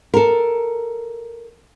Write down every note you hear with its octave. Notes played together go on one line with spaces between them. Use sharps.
A4 A#4